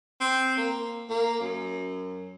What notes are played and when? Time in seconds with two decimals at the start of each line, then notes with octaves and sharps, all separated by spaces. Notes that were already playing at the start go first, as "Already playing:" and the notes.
0.20 C4
0.57 A#3
1.10 A#3
1.40 F#2